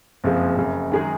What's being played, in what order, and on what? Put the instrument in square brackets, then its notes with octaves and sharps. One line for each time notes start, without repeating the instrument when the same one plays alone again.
[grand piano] F#1 F2 F3 G#3
F#1 F#2 C#3
F#2 D#3 G#3 D#4 G#4